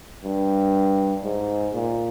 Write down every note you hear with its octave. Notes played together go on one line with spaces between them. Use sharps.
G2
G#2
A#2